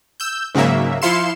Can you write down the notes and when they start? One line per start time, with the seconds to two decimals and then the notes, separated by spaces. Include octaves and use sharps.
0.20 E6 G6
0.55 G#2 C#3 F#3 A#3 E5
1.02 F3 E4 F5 C6 C#7 E7